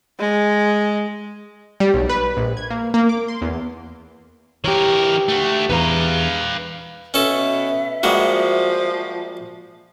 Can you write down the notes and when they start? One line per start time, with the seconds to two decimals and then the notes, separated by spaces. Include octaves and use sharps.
0.19 G#3
1.80 G3
1.94 B1
2.09 B4
2.37 A#1
2.57 G#6
2.70 A#3
2.94 A#3
3.09 D6
3.28 C6
3.41 E2
4.64 E3 G4 A#4 C#5
5.28 A3 F#4
5.70 E2 E3 B4 F5 A#5
7.14 B2 C#4 A4 E5
8.03 F3 G3 G#3 A#3 F#4